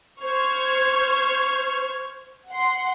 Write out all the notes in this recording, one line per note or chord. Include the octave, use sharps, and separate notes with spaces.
C5 C#6 F6 G#6
F#5 C6